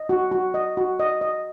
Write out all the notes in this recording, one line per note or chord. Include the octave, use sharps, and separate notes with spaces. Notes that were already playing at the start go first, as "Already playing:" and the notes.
Already playing: D#5
F#4
F#4
D#5
F#4
D#5
D#5